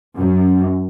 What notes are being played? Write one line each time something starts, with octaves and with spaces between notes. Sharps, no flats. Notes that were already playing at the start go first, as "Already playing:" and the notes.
F#2